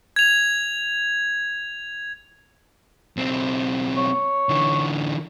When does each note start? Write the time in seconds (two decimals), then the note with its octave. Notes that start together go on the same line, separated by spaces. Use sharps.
0.16 G#6 F7
3.17 B1 C4
3.97 C#5
4.49 D3 E3